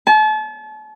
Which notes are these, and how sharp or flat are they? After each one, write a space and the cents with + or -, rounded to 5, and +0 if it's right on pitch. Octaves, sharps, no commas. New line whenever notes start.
A5 -35